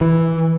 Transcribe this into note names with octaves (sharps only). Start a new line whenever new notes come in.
E3